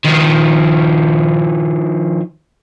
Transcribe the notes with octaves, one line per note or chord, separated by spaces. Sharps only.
D#3 F3